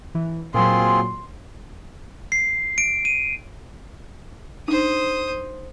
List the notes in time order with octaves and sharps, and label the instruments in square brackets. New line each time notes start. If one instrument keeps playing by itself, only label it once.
[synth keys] E3
[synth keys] A#2 F#3 [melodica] C4 F4 G#4 [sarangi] C6
[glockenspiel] C7
D7
D#7
[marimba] D4 D#4 [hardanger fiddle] C5 D#6